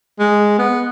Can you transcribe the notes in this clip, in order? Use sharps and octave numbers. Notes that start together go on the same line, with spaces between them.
G#3
B3